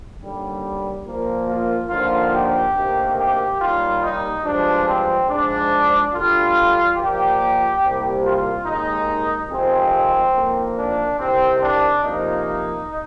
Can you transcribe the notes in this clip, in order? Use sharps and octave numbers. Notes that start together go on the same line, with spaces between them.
D#2 D3 G3
A#2 F3 A#3
F4
D#2 D3 F3 A#3 F4
G4
D2 C3 D#3 A#3
G4
D#2 D#3 G3 A#3 F4
D#4
G2 F3 G#3 D4
C4
G#2 F3 G#3 D4
D2 D3 G3 F4
A#2 F3 A#3 G4
C2 C3 G3 A#3
F4
D#2 D#3 G#3 D#4
F2 C3 D#3 G#3 C4
F2 D#3 A#3
D4
C2 C3 D#3 C4
D4
F2 C3 F3 A#3 D#4